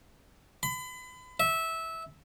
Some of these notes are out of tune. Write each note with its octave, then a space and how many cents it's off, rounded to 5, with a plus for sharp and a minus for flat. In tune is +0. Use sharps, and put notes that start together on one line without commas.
B5 +40
E5 -15